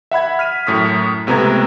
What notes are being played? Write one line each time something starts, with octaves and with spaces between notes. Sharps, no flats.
E5 F#5 B5 G#6
F6 B6 D#7
F#2 A2 D#6 B6
C#2 C3 A3 B3 A#5 G#6